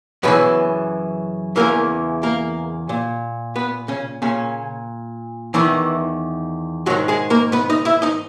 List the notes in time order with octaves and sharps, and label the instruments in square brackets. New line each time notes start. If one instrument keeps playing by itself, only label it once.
[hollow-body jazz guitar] F#2 C#3 E3 B3 B4
E2 C#3 E3 A#3 A#4
A#3 A#4
A#2
B3 B4
C#3 C#4
A#2 C#3 C#4
E2 D#3 E3 E4
G#2 F#3 F#4
D#3
G#3 G#4
A#3 A#4
B3 B4
D#4 D#5
E4 E5
D#4 D#5